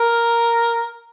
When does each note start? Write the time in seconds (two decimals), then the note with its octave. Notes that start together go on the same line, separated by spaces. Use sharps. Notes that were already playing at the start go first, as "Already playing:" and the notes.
Already playing: A#4